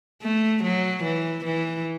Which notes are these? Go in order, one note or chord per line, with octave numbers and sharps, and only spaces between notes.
A3
F#3
E3
E3